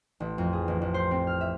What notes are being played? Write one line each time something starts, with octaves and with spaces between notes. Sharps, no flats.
A1
F2
G#4
A1
A1
C5
C4
F6
E5